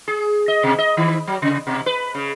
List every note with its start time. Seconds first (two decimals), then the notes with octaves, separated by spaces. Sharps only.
0.08 G#4
0.48 D#5
0.63 B2
0.79 D#5
0.97 D#3
1.27 F#3
1.42 C3
1.67 B2
1.86 B4
2.15 C#3